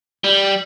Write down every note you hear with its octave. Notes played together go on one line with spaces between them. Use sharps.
G3